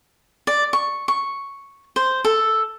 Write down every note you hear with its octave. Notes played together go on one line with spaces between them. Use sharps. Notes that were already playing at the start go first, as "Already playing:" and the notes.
D5
C#6
C#6
C5
A4